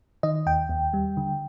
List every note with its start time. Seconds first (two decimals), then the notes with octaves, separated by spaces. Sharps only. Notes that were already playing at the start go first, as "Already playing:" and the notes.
0.23 D#3 D#5
0.46 D#2 G5
0.69 D#2
0.93 G3
1.17 D3